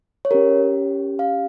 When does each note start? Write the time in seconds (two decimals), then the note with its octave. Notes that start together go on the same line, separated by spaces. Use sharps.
0.25 C#5
0.31 C#4 G4 A#4
1.19 F5